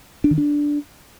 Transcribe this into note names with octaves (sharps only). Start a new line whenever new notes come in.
D4
D#3
D4